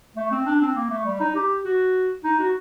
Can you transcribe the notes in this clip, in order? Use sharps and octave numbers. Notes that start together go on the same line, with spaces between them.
A3
C4
D4
C4
A#3
A3
G3
D#4
G4
F#4
D#4
F#4